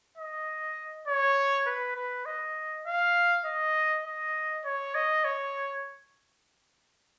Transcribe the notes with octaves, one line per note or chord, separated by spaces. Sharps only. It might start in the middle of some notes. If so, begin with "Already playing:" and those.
D#5
C#5
B4
B4
D#5
F5
D#5
D#5
C#5
D#5
C#5